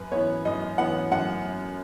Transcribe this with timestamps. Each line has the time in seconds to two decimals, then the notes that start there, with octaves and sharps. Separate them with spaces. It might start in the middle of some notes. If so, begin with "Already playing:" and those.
Already playing: F#2 B4
0.12 E3 B3 C#5
0.45 F#2 D#5
0.78 E3 B3 F#5
1.12 F#2 F#5